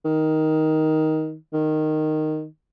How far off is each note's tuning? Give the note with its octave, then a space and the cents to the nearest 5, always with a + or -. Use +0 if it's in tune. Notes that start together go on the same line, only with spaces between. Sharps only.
D#3 +10
D#3 -10